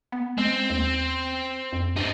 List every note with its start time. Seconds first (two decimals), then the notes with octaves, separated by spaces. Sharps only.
0.12 B3
0.38 G#3 C4
0.70 D#2
1.73 F2
1.96 G2 C4 D#4